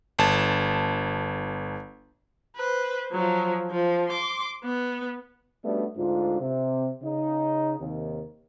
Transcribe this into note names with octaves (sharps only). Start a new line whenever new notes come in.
G1 A5
B4 C5
F3 F#3
F3
C6 D6
B3
G3 A3 B3 C#4 D4 F#4
D2 G#2 D4 F4
C3 C4
C#3 D#4
D#2 C3 D#3